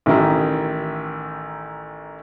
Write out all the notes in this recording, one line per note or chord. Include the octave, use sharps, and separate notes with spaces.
A1 D#3 E4 A#4